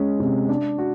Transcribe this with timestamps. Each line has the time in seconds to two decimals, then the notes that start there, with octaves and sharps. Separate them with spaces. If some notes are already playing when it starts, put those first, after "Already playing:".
Already playing: G#3 C#4
0.20 C3
0.49 D4
0.78 F#4